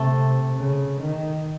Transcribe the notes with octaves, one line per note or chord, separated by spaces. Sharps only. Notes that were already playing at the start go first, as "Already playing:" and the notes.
Already playing: C3 A3
C#3
D#3